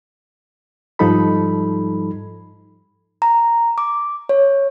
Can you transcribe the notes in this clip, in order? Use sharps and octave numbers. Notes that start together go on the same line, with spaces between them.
G#2 F3 G3 D#4 A4 B5
A#5
D6
C#5